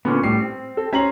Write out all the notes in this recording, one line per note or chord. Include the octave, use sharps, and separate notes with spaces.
A#2 D3 B3 C#4
A2 G3 C7
C4
A4
C#4 G4 C5 A#5 F#7